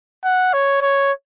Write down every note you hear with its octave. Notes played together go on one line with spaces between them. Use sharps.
F#5
C#5
C#5